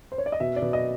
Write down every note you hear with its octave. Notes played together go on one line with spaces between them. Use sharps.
C5
C#5
D5
D#5
B2 E5
D5
B2
D#5